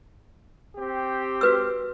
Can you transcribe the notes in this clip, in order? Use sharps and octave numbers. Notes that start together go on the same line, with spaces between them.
C4 G4
F#4 B4 E6